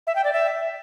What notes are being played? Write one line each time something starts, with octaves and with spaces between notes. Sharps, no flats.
E5
G5
D5
E5